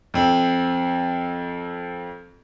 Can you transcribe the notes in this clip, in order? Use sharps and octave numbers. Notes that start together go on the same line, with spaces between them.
F2 C4